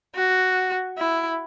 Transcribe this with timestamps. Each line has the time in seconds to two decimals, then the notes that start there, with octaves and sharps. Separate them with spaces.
0.15 F#4
0.98 E4